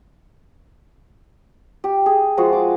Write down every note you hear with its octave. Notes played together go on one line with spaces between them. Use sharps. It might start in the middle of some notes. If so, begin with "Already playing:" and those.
G4
G#4
F3 G#3 F#4
D6